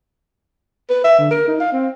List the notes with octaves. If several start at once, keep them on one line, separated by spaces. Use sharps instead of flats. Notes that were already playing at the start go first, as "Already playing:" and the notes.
B4
E5
D3
A#4
D#4
F5
C4